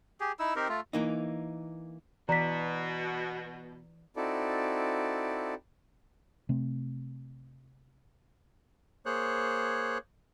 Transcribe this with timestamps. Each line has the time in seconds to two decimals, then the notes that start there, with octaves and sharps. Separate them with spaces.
0.20 G4 G#4
0.39 D#4 E4 E6
0.56 C4 D#4 G4 A#4
0.68 A3 F4
0.93 E3 A#3 D#4
2.29 B2 E3 D5 A#5 B6
4.16 C4 D#4 E4 F#4 A4 D5
6.49 C3 A3 C4
9.06 A#3 G#4 C5 C#5 F#6